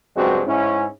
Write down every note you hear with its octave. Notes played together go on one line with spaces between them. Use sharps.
C#2 G2 F#3 G#3 C4 F#4
G#2 C#4 E4